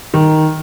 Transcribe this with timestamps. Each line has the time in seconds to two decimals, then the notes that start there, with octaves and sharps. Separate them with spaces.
0.14 D#3